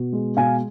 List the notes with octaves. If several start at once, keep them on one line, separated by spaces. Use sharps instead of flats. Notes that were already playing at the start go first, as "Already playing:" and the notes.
Already playing: B2
G#3
B2 F5 G#5